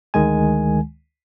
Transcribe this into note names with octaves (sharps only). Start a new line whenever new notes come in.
D2 D#3 G#3 G#5